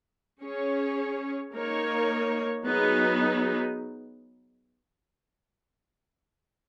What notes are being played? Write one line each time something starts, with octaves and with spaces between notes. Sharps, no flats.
C#4 G#4 C#5
A#3 D#4 A#4 C#5
F#3 B3 D#4 G#4